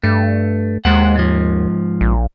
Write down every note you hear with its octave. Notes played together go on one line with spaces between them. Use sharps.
G2 A3
D#2 G#3 C5 F#5
G#2 F3
A#1